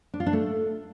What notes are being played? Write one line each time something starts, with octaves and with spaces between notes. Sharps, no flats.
D4
F4
D4
A3